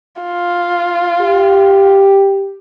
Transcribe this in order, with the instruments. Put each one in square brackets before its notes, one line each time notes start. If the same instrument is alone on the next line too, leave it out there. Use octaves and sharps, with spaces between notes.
[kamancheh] F4
[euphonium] G4